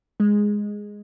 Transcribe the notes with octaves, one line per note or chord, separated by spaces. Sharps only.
G#3